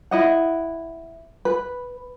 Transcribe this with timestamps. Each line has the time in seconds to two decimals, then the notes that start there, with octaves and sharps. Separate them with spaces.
0.11 E4 D#5 F#5
1.45 B4